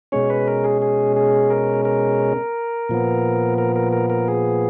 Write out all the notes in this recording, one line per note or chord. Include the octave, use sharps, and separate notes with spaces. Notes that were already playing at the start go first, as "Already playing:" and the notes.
B2 G#3 C#4 C#5
B4
A#4
G#4
G#4
G#4
A#4
A#4
A#2 F3 B3
A#4
A#4
A#4
A#4
G#4